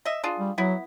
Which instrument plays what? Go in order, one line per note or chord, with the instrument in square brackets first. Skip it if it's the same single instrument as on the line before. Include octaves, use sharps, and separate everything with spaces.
[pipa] D#5 E5
D4 F4 G#4
[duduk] G3
[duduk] F#3 [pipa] B3 E4